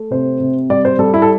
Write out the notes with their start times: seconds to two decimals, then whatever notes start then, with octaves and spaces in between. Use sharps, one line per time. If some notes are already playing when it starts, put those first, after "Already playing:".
Already playing: A3
0.11 C3 C5
0.40 C3
0.70 G3 D5
0.85 C5
0.99 G3 A4
1.14 E4
1.22 A4